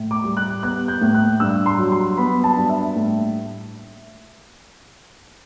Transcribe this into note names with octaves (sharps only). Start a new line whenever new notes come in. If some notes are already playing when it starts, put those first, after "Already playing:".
Already playing: A2
D6
G3
F#6
B3 F#6
G6
A2
F#6
G2 E6
C6
F#3
C6
B3 B5
A5
G2
E5
A2